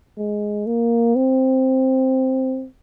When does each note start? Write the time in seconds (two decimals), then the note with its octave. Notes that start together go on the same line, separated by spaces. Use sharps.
0.18 G#3
0.67 A#3
1.16 C4